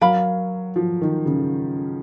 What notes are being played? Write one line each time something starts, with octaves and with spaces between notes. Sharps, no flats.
F#3 A#4 F5 B5
F3
D#3
C#3